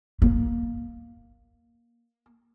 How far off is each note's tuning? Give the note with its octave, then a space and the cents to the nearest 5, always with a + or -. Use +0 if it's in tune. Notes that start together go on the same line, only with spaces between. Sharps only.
A#3 +10